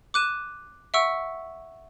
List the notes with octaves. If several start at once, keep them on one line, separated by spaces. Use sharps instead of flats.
D6 F#6 D#7 E7
E5 F#5 C#6 E6 D7